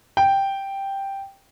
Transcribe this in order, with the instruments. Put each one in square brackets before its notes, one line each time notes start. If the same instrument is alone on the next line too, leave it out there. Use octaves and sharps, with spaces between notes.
[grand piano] G5